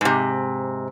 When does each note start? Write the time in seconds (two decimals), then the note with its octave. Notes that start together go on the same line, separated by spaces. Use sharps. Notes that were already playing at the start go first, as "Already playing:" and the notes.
0.01 G#2 C3